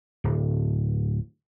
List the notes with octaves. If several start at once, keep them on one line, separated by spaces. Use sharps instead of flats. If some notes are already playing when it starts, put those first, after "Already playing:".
D1